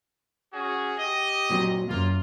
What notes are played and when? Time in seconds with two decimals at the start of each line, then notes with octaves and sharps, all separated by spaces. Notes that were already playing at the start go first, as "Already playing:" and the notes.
0.53 C#4 F#4 G#4
0.98 G4 D#5
1.50 A#2 F#3 C4
1.89 C#2 F#2 A#3 F4